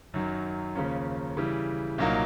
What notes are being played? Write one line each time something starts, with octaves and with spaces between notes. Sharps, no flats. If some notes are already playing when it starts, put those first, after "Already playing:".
F#2 D#3 F#3
D#2 C#3 F3 A#3 C#4
C#3 E3 G3
C2 A#2 F#3 A#3 D#4